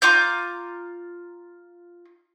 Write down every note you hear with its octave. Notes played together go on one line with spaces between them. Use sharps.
F4 A#5 D6 G6